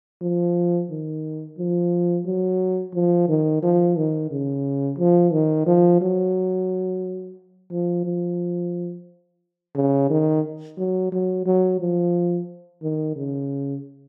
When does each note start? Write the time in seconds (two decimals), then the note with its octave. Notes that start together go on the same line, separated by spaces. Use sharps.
0.22 F3
0.90 D#3
1.58 F3
2.26 F#3
2.94 F3
3.29 D#3
3.63 F3
3.97 D#3
4.31 C#3
4.99 F3
5.32 D#3
5.67 F3
6.01 F#3
7.71 F3
8.05 F3
9.75 C#3
10.10 D#3
10.78 F#3
11.12 F#3
11.46 F#3
11.80 F3
12.82 D#3
13.16 C#3